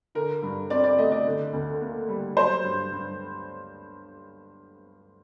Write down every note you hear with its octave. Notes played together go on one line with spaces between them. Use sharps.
D3 A#4
G2
C4 D5
D5
A3 D#5
D5
D3
D2
A#3
G3
F#3 C5
G2
G2